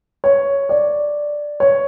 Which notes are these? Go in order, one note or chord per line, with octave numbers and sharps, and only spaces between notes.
C#5
D5
C#5